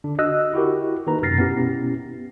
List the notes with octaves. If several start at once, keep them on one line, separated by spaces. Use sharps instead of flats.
D3 D4
F#4 D#5 E6 F#6
E4 F#4 G4 A#4
D#3 A#3 B4 A#5
F#2 C3 F6 A6 A#6 C7
B2 B3 C#4 E4 G4